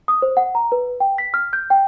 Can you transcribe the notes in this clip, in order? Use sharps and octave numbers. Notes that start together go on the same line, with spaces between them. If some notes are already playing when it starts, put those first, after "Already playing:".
D#6
C5
F#5
A#5
B4
G5
B6
F6
G6
G5